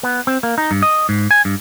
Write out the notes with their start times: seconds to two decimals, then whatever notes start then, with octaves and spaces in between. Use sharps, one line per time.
0.03 B3
0.27 C4
0.43 A#3
0.58 D#4
0.71 G2
0.82 D#5
1.09 G#2
1.31 G#5
1.45 G2